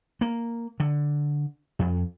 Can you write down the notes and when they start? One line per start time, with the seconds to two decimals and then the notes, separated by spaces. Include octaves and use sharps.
0.21 A#3
0.80 D3
1.79 F2